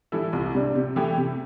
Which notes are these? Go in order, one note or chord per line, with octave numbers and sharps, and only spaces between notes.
E3 G3 E4 A4
C2
C3 G3 D4
C3
E3 A3 E4 G4
C3